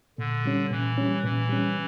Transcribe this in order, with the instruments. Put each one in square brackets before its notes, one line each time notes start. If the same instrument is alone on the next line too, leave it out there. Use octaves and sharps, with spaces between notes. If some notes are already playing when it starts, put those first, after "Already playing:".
[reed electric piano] A#2 [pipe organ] D3
[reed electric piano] G3 C#4
[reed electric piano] A#2 [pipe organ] E3
[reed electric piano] G3 C#4
[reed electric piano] A#2 [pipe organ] E3
[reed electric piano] G3 C#4